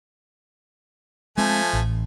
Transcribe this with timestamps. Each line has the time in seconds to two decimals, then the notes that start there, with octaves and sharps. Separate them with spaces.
1.38 F3 G#3 A3 C4 G#5
1.73 A1